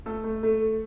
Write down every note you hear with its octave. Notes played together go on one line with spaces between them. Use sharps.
A3 A4
A3
A3